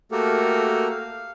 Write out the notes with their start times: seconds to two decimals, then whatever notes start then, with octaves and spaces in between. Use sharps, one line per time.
0.12 A3 A#3 F#4 G4 A4 A#4
0.90 F5